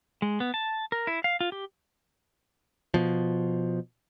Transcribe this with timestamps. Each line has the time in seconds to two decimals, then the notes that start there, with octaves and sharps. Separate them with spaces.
0.22 G#3
0.40 B3
0.54 A5
0.92 A#4
1.07 E4
1.24 F5
1.41 F4
1.52 G4
2.94 B2 F3